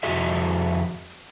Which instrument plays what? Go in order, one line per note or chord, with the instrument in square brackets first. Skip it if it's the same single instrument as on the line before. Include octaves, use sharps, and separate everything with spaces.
[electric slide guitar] F2 F#4 G#4 E5